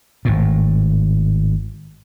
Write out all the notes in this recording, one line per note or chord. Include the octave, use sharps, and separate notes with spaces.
G#1 A2